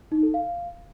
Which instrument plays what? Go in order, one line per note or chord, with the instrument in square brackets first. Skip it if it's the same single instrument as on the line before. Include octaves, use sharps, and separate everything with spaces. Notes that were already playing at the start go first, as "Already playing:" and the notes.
[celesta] D#4
A4
F5